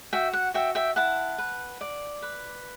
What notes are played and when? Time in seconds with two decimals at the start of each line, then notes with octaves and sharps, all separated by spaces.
0.13 F#4 E5 G5
0.33 F#5
0.54 F#4 E5 G5
0.75 E5 G5
0.96 E4 F#5 A5
1.38 B4
1.81 D5
2.22 B4